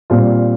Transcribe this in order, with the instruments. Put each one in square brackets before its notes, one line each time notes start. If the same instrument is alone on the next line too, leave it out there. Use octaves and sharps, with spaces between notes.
[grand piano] A#2 G3 C4 F4